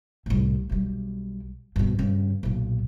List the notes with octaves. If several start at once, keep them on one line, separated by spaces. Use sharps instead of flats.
C2 A2
B1 G3
G2 B2
G2 C#3
B1 A#2